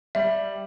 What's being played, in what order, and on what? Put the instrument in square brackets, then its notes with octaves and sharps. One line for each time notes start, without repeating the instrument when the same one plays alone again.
[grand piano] G3 [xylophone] E5